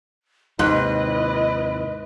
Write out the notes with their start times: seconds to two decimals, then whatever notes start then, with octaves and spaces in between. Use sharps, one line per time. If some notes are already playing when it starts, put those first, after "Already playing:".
0.59 D#2 G#2 C3 E4 B4 D#5